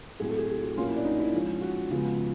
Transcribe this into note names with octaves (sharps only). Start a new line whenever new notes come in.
A2 F#3 A3 C4 G#4
A4
G#4
G4
F#4
A#2 F#3 A#3 C#4 F4
E4
D4
D#4
E4
F3 G#3 C#4
F#4
C#3 F3 G#3 B3